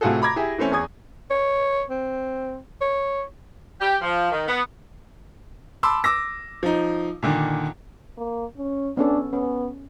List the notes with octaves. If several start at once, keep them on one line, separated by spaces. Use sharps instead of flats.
A2 C3 F4 F#4 G#4 A4
A#5 B5 D6 G#6 A#6
E4 G4 G#4
E3 A3 C4 C#4
E2 G#4 C#6 D#6 G#6
C#5
C4
C#5
G4
F3
D#3
B3
A5 B5 C6 D6 E6
D6 E6 A#6
F3 D#4
A#2 D3 D#3
A#3
C#4
B3 C#4 D4 A4
B3 C#4